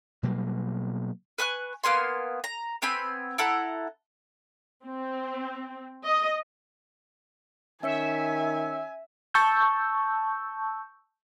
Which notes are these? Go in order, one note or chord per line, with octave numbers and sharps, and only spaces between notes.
B2 F#3 G3 A#3
B4 G#5 C#6 F#6
A#3 B3 G#5 C6
A#5
B3 C4 G#5 B5
E4 A4 F#5 A#5
C4
D#5
D#3 C#4 C#5 E5 G#5 C#7
A5 C#6 E6 G6